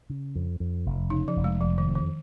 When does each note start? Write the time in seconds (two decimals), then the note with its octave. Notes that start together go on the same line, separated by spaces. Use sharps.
0.10 C#3
0.35 F2
0.60 F2
0.86 F1
1.10 C#3 D#4
1.28 F3
1.36 F1
1.44 G#3
1.61 F1 F3
1.78 D#3
1.87 F2
1.95 D#3